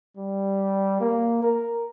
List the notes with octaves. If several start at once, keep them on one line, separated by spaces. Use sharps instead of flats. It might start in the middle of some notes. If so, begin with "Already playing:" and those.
G3
A#3
A#4